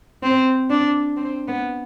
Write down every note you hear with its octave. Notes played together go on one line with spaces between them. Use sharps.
C4
D4
C4
B3